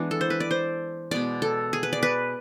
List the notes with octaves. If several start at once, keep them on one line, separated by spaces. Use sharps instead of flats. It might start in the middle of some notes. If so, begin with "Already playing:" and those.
Already playing: E3 G#3 B3 D4
A4
C5
B4
D5
C5
B2 G#3 B3 D5
A4
G#4
B4
D5
B4